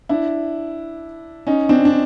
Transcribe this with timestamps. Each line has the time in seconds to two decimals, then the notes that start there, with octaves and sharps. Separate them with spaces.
0.09 D4 E4
1.47 C#4 D#4
1.69 C4 D4
1.85 D4